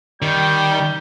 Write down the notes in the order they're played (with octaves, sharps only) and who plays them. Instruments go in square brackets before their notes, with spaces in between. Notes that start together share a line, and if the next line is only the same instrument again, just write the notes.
[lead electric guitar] D#3 [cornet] G3 [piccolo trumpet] G6